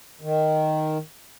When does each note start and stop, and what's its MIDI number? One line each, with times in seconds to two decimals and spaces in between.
0.21 0.98 51